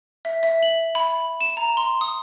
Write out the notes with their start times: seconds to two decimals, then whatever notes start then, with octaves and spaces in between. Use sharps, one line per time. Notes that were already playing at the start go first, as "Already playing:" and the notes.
0.25 E5
0.43 E5
0.63 F#7
0.95 B5
1.41 E7
1.57 A#5
1.77 C6
2.01 D#6